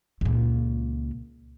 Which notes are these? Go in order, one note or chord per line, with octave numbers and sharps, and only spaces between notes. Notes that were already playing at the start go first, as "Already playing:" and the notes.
C#2 A#2